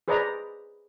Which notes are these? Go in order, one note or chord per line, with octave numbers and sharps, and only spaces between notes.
G#4 B4 C5 D5 D#5 A#5